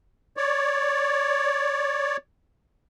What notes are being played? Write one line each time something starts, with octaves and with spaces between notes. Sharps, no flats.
C#5 D5